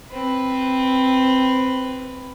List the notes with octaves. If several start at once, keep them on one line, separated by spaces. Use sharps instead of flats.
C4 B4